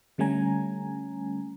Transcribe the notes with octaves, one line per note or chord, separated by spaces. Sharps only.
D3 G3 A3 C#4 G#5 A#5